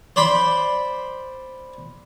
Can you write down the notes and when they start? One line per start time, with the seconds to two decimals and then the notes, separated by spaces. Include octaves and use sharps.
0.16 C5 D5 B5 C6